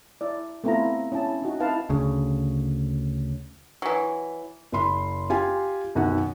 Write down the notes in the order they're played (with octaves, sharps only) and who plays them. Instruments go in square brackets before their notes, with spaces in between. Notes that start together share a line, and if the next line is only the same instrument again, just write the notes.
[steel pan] E4 D5
A3 B3 C4 E4 F4 A#5
C#4 E4 G5 A5
D#4 F#4
C4 D#4 E4 B4 F5 A5
[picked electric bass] D2 C#3
[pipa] E3 F#3
[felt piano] F#1 B5 C6
F4 G4 G#5
B1 F#2 D#3 F#5